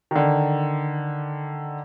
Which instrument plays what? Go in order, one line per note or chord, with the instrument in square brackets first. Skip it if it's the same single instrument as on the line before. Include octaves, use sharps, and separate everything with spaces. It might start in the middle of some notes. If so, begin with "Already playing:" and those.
[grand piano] D3 D#3